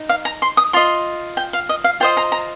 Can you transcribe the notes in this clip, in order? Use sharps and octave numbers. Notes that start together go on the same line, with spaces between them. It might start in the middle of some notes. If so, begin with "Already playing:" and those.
Already playing: D#4
F5
A#5
C6
D#6
F4 D#5 C6
G5
F5
D#5
F5
F4 C5 D#5 G5
A#5
A#5